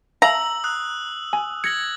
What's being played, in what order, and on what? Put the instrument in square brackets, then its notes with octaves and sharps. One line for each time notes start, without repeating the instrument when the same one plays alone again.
[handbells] E5 F5 [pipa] A#5 [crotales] E6 F#7
[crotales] D#6 F#6
[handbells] G#5
[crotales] G#6 A#6 F#7 [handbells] C#7